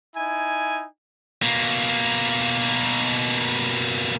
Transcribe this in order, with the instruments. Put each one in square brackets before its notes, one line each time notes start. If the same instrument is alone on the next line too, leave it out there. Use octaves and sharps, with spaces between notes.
[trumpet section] D#4 E4 G#5
[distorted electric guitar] B2 A#3